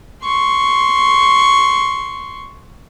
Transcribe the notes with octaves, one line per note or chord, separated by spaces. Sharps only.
C6 C#6